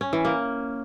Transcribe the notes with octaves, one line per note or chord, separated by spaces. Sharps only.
C#4
E3
A#3